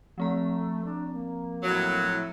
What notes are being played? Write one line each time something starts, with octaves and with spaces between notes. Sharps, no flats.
F3 A3 C4 A#5
D4
A#3
A2 F#3
E4